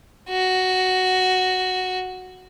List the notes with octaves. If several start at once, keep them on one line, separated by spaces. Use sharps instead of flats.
F#4